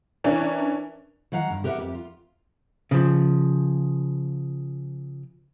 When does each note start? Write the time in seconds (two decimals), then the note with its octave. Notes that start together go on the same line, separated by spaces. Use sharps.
0.24 E3 C#4 D4 A#4
1.32 D#3 F#3 F5 F#5 A#5
1.51 G2
1.64 G4 A#4 B4 D#5 E5 F#5
1.78 F2 G4
1.95 F4
2.91 C#3 F3